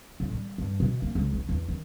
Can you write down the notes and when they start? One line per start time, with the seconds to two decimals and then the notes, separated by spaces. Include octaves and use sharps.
0.20 A2
0.32 G3
0.58 G2
0.80 B2
1.02 A#3
1.15 C#2
1.33 A1
1.49 E2
1.68 D#3